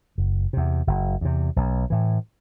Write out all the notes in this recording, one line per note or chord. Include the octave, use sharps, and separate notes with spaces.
F#1
E2 C3
F#1
E2 C3
B1
A2 E3